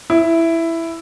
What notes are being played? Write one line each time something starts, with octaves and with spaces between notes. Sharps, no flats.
E4